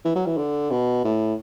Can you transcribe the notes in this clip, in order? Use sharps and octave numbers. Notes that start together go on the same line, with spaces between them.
E3
F#3
E3
D3
B2
A2